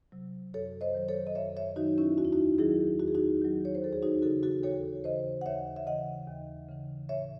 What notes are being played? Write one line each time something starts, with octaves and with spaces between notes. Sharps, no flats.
C3 F#3
F#2 A4 C#5
C5 D#5
D#3 F#3
A4 C#5
D#5
F#2 C#5 E5
C#5 E5
D#3 F#3 D#4 F#4
C#4 E4
E2 F#4
E4
D#4 F#4
D#3 F#3 E4 G#4
E2 F#4
G#4
D#4 F#4
D#3 F#3
C#5
C5
D#2 A4
G#4
D#4 F#4
C#3 E3 F#4 A4
F#4 A4
D#2 A4 C#5
C#3 E3 C5 D#5
F#5
D#2 C#5 E5
E5
C#3 E3 D#5 F#5
D#2
C#3 E3
A2 C#5 E5